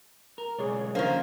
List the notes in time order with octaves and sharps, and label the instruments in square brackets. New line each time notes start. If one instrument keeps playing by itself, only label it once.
[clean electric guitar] A#4
[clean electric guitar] B1 G#3 [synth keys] G#4 C#5 D5
[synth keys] D3 F3 C5 [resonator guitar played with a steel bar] D#3 A#3 [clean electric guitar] C#4